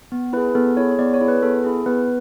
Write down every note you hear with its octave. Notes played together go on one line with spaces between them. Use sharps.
B3
E4 G#4 B4
B3 A4
E4 G#4 C#5
C#5
B3 D5
C#5
E4 G#4
B4
B3 A4
E4 G#4
B3 B4